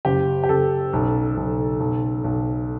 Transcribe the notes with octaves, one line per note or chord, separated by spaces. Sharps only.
F#1 G4
G4
F#1 A4
B1
B1
B1
B1